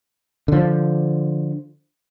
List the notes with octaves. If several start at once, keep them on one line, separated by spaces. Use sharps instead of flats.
D3 F3